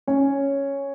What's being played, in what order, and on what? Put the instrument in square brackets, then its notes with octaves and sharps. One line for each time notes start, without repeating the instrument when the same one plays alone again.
[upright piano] C#4 C#5